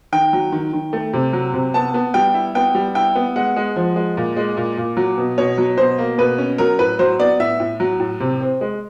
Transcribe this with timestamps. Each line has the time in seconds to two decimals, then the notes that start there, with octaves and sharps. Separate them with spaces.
0.12 D#3 G5
0.33 F#3
0.52 D#3
0.73 D#3
0.93 A3
1.13 C3
1.33 F#3
1.54 C3
1.74 B3 A5
1.94 B3
2.14 G3 G5
2.34 E4
2.55 B3 G5
2.75 G3
2.95 E4 G5
3.15 B3
3.36 G#3 F#5
3.56 G#3
3.76 F3
3.96 G#3
4.17 A#2
4.37 G#3
4.57 A#2
4.77 A#2
4.97 F#3
5.18 B2
5.38 B2 C#5
5.58 F#3
5.78 B2 C5
5.98 A#3
6.18 B2 B4
6.38 C#4
6.58 F#3 A#4
6.79 A2 B4
6.99 F#3 C5
7.20 B3 D5
7.40 A2 E5
7.60 A2
7.80 F#3
8.00 A2
8.20 C3
8.40 C4
8.61 G#3